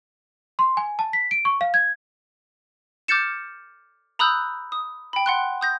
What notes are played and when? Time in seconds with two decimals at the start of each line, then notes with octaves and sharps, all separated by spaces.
0.59 C6
0.77 G#5
0.99 A5
1.13 B6
1.31 D7
1.45 C#6
1.61 F5
1.74 G#6
3.08 D6 F6 G6 A6 C#7 E7
4.19 A#5 B5 D#6 E6 F#6 G6
4.72 D#6
5.13 G5 B5
5.26 F#5 C6 F#6
5.61 D#6 G6 A#6